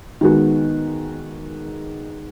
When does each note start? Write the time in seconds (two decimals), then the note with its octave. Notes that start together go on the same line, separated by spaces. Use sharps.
0.21 D#3 G#3 B3 F#4